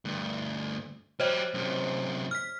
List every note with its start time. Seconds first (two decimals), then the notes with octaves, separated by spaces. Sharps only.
0.05 D2 G2
1.20 F#3 G4 C5 C#5 D#5
1.54 F#2 C3
2.31 F6 B6